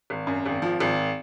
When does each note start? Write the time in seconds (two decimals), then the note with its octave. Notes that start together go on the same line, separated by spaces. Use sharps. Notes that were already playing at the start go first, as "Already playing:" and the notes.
0.10 G#1
0.27 F#2
0.46 G#1
0.62 F3
0.80 G#1